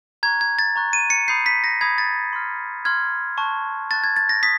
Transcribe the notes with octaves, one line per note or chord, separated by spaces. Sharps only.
A#5 C#6 F#6 G#6
G#6
A6
A#5 C#6 F#6
D#7
C#7
B5 D#6 G6 C7
B6
A#6
B5 D#6 G6 G#6
A6
C6 F6
C6 F6 G#6
A5 C#6 F#6
A5 C#6 F#6 A6
G#6
A6
A#6
D#6 B6